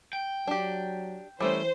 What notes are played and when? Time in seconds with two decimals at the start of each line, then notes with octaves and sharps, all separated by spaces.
0.13 G5
0.47 F#3 D4 G4
1.40 E3 G3 A3 C#4 C5